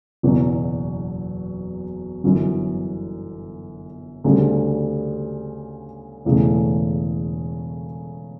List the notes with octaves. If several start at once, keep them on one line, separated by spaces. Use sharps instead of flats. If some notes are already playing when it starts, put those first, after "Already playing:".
F#1 E2 B2 F#3
G1 F#2 E3
D2 C#3 G3 D4
E1 E2 C#3 E3 A3